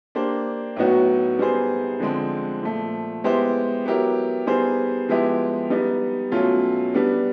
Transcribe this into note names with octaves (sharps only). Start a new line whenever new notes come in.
A#3 D4 G4 C5
A2 F#3 B3 D#4 F#4
G3 B3 D#4 G#4 C5
D3 F3 G#3 C4
A#2 F3 A3
G#3 B3 E4 G4 C5
F#3 B3 E4 G4 A#4
G3 B3 D#4 G#4 C5
F3 G#3 B3 E4 G4
G3 B3 D#4
B2 F#3 A3 C#4 F4
G3 B3 D4